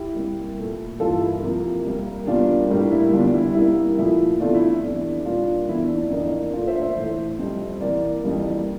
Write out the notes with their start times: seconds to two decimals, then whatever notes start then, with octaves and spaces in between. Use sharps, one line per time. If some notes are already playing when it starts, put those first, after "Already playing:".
Already playing: E4 G4
0.14 C3 G3 A#3
0.57 A#2 A3
1.00 G2 E3 A#3 F4 A4
1.21 E4
1.43 C3 F3 A#3
1.85 C3 G3 A#3
2.27 E2 C3 G3 A#3 D4 F4
2.70 A2 G3 A#3 D4
2.91 E4
3.12 E2 D3 G3 D4 F4
3.23 D4
3.34 E4
3.44 E4
3.55 C3 G3 A#3 E4
3.98 A#2 F3 A3 E4
4.40 E2 C3 E3 A3 D4 F4
4.55 E4
4.69 E4
4.83 E2 C3 E3 D4
5.25 A#2 G3 A#3 D4 F4
5.68 E2 C3 E3 A3 E4
5.82 D4
5.97 D4
6.10 F2 E3 A#3
6.53 A#2 A3 D4 F4
6.67 C5 E5
6.82 C5 E5
6.96 A2 E3 A3
7.39 F2 C3 G3
7.81 C3 E3 A#3 A#4 D5
8.24 F2 E3 G3 A#3